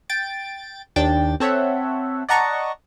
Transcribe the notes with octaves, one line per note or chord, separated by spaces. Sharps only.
G5 A6 D7
D#2 D4 G5 A6
C4 A4 C#5 E5 F#5
D5 D#5 F#5 A5 A#5 C#6